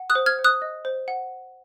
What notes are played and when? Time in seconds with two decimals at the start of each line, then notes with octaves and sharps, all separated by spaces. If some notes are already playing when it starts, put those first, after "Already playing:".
Already playing: F#5
0.10 D#6 F#6
0.15 C5
0.26 F6 G#6
0.39 C5
0.44 D#6 F#6
0.62 D#5
0.85 C5
1.08 F#5